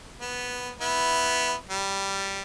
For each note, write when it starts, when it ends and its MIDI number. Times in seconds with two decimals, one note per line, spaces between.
0.21 0.72 59
0.81 1.54 59
0.81 1.54 64
1.69 2.43 55